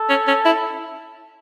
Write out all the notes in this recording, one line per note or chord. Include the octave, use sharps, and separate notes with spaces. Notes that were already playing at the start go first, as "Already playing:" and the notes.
Already playing: A4
C#4
C#4
E4